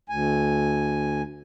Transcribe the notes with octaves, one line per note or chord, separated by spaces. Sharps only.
D2 G#5